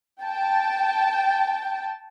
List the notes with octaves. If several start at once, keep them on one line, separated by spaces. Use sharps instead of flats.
G5 A5